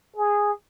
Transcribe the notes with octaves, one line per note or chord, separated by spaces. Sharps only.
G#4